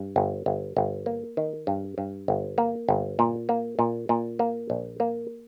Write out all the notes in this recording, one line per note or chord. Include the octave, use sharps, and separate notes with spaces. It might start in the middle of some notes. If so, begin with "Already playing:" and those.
Already playing: G2
G1
G1
G1
A#3
D#3
G2
G2
G1
A#3
G1
A#2
A#3
A#2
A#2
A#3
A#1
A#3